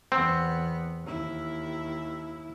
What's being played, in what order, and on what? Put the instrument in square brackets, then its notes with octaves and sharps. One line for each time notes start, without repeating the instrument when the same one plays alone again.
[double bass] E2 B3 [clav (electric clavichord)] C4
[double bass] D#2 E4